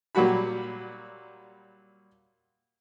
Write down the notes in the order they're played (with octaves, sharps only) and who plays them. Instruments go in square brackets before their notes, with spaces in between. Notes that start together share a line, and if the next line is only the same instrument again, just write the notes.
[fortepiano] A#2 F#3 G3 F#4 B5